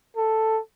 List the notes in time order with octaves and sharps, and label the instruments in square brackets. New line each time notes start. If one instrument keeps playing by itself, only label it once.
[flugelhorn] A4